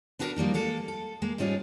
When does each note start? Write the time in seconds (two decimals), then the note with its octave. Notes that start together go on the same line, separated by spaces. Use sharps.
0.19 B3 D4 F#4 G#4 A#4 B4
0.36 F3 G3 A#3 D#4
0.54 G#3 A#3 A4
0.88 A4
1.22 G#3 A#3
1.38 G#2 G3 C#4 F4 G#4